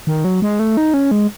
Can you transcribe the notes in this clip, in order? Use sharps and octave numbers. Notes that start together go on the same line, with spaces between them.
D#3
F#3
G#3
A3
D#4
C#4
G#3